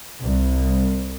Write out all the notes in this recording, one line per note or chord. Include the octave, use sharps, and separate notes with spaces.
C2